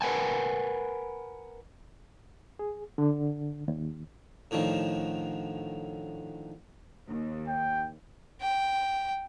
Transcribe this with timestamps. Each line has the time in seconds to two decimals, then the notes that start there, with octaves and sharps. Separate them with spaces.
0.01 A#4 B4 F#5 G#5 A5
2.59 G#4
2.98 D3
3.68 D#2
4.51 A2 D3 D#3 F3
7.10 D#2
7.48 G5
8.41 G5